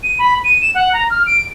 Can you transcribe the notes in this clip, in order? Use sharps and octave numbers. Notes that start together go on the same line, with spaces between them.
D#7
B5
D#7
E7
F#5
A#5
F6
D7